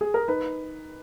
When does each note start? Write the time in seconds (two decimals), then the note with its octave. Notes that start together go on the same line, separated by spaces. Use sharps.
0.01 G#4
0.14 A#4
0.28 D#4 B4